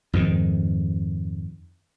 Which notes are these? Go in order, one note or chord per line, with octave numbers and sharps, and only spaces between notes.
F2 G#2 D#3